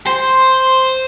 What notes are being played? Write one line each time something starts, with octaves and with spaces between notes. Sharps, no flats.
C5